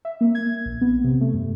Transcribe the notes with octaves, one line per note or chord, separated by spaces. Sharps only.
E5
A#3
G#6
A#1
B3
C3
A3
G2